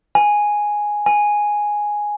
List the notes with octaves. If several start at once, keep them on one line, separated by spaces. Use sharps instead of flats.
G#5
G#5